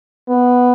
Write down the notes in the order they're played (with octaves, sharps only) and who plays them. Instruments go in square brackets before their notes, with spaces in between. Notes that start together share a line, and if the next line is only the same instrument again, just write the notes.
[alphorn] B3